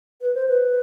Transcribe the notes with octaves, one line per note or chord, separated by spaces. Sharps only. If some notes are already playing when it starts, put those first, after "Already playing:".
B4
C5
B4